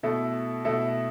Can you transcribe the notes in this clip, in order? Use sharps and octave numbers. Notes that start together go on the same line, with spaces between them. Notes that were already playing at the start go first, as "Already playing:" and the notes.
B2 A3 E4 A4
B2 A3 E4 A4